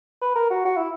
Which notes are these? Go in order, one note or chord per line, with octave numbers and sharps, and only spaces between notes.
B4
A#4
F#4
F#4
E4